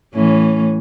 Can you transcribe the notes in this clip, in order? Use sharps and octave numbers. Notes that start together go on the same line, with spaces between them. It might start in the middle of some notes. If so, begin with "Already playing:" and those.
A2 E3 C#4